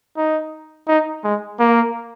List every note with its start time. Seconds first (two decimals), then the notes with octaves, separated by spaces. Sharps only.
0.17 D#4
0.88 D#4
1.24 G#3
1.60 A#3